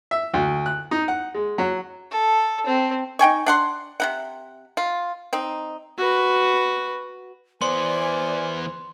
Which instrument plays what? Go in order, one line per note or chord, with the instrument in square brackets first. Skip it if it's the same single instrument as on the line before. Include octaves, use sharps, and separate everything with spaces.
[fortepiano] E5
D2
F#6
D#4
F#5
G#3
F#3
[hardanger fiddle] A4
C4
[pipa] D#4 G5 G#5 C#6
D4 F#5 C6
C3 D#4 F#5
F4
C4 D#4
[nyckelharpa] F#4 B4
[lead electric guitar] E3 B3 [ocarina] C5 [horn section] D5 G#5 [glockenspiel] C6